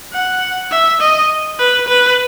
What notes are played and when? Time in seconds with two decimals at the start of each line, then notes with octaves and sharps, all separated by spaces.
0.13 F#5
0.71 E5
1.01 D#5
1.59 B4
1.88 B4